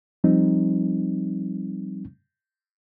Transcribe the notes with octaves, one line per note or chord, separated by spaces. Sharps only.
F3 G3 C4 D#4